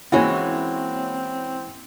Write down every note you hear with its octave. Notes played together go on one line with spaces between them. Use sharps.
E3 G#3 A#3 C4 C#4 E4 F#4